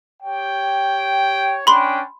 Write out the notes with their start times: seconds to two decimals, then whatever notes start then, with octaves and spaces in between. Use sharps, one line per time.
0.23 G4 C#5 G5
1.67 C#4 D4 G5 B5 C6